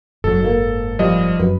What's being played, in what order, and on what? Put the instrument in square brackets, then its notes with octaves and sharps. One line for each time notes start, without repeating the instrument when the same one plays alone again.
[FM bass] F#1 [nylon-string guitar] G#2 F#3 [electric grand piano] A4
[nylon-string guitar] G#2 A#3
[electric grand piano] F3 G3 D#5
[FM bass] F#2 [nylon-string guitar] B4